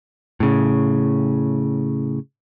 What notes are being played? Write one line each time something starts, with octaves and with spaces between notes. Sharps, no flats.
A2 C#3